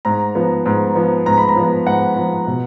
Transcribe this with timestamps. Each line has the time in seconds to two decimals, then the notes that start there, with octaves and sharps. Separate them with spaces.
0.05 G#2 A#5
0.35 F3 B3
0.66 G#2
0.95 F3 B3
1.26 G#2 A#5
1.38 B5
1.49 A#5
1.56 F3 B3
1.86 G#2 F#5
2.16 F3 B3
2.47 B2